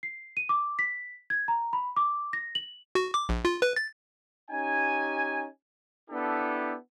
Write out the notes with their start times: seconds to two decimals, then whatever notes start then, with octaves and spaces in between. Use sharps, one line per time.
0.03 C7
0.37 D#7
0.49 D6
0.79 B6
1.30 G#6
1.48 A#5
1.73 B5
1.96 D6
2.33 A#6
2.55 F#7
2.95 F#4
3.14 D6
3.29 A#1
3.45 F4
3.62 B4
3.76 A6
4.51 C#4 D#4 G4 G#5
6.10 B3 D4 E4 G4 A4